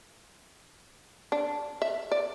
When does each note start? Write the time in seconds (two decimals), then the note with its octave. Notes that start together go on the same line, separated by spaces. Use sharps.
1.32 D4
1.82 E5
2.12 D5